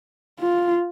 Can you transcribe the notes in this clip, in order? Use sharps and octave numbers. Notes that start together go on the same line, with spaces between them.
F4